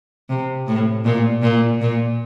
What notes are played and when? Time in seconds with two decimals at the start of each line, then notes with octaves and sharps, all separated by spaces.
0.29 C3
0.67 A2
1.05 A#2
1.42 A#2
1.81 A#2